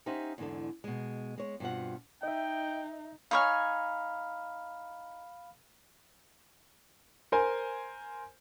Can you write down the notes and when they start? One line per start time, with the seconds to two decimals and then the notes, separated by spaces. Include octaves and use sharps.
0.06 C#4 D#4 G4 C5 E5 F#5
0.38 E2 G#2 D3 E4 A4
0.84 B2 G#3
1.38 G#3 C#5
1.60 G2 B2 C4 F4 F#5
2.23 D#4 D#5 E5 G5
3.31 D#4 C#5 F5 G#5 B5 F6
7.32 A#4 C5 G#5